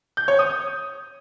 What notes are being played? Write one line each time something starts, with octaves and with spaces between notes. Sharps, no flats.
G6
C#5
D#6